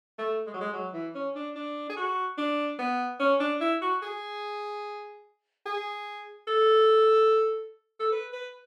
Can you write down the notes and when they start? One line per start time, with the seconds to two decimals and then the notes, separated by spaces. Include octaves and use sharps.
0.18 A3
0.47 G#3
0.54 F#3
0.61 G#3
0.73 F#3
0.94 E3
1.15 C#4
1.36 D4
1.56 D4
1.89 G#4
1.96 F#4
2.38 D4
2.79 B3
3.20 C#4
3.40 D4
3.61 E4
3.81 F#4
4.02 G#4
5.66 G#4
6.47 A4
8.00 A4
8.12 B4
8.33 B4